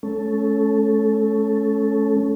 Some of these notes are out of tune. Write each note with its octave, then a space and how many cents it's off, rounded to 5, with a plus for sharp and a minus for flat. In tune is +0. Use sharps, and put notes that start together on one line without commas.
A3 -45 C#4 +0 A4 +0